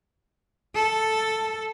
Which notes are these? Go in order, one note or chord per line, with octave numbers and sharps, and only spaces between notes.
A4